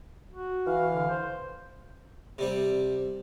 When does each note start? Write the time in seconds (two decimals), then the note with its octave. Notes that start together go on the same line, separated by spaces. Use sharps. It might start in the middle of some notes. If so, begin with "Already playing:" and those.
0.30 F#4
0.67 E3 F5
0.93 D3
1.09 C5
2.38 C3 G3 C4